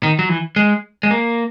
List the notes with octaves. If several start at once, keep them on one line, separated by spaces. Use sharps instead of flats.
D#3
F#3
E3
G#3
G#3
A#3